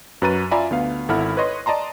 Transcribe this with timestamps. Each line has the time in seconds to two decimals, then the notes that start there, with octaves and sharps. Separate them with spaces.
0.22 F#2 F#4 B4 A#5 A6 D#7
0.51 F4 D5 E5 G#5 A#5 B5
0.71 D2 B3 F5
1.09 G#1 E4 A4 F#5 B5 F6
1.37 B4 C#5 D#5 C6 A#6
1.66 D5 D#5 A5 A#5 C6